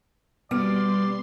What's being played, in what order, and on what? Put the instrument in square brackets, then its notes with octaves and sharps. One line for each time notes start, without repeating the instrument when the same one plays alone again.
[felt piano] B2 F6 D7 [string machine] G3 C6 [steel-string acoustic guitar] B3 [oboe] D5